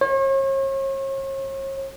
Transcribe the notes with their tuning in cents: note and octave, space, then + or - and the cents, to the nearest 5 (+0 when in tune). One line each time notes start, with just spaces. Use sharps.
C#5 -40